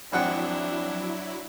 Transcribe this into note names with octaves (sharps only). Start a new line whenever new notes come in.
G#1 F2 F#3 D4 E4 F#5 G5